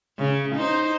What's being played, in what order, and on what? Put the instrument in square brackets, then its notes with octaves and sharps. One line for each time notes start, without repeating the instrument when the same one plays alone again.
[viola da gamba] C#3
D#4 C5